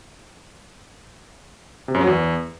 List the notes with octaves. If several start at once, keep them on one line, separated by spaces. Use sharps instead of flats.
C3
F#2
F#3
E2